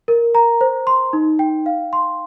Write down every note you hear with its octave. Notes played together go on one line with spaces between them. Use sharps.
A#4
A#5
C5
C6
D#4
G5
F5
C6